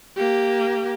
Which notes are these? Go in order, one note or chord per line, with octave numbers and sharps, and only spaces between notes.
A#3 G4